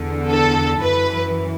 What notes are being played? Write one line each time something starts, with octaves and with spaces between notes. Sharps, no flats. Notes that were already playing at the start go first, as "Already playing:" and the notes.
Already playing: E2 D3
A4
F#2 E3 B4